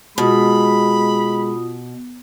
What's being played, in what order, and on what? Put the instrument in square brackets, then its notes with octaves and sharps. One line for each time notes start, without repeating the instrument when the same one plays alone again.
[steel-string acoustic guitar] B2 [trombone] G#3 [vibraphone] F4 D#6 [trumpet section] B5